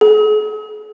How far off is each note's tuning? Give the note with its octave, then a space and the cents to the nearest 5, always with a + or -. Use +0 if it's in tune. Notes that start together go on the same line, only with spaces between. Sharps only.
G#4 +45